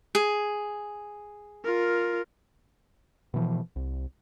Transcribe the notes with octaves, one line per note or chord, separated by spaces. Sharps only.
G#4
F4 A#4
B2 E3 F3
C2